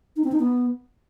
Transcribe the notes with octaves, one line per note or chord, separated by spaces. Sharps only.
D#4
C4
D#4
B3